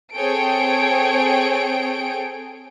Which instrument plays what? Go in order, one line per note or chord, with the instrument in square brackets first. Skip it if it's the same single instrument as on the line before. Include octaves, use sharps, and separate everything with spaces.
[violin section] C4 G#4 A4 C#5 G5 D7